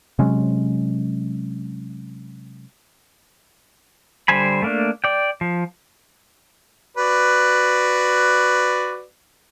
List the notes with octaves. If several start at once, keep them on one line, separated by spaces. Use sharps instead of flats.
C3 F#3 G#3 C#4
D3 G3 C5 G#5 B5
A3 A#3 D4
D5 G5
F3
F#4 B4 D5